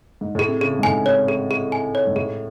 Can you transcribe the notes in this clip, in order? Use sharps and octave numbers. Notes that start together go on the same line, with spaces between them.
G#2
A2 G#4
C3
C#3 G#4
G#2
A2 G#5
C3 C#5
G#4
G#4
G#5
C#5
G#2
A2 G#4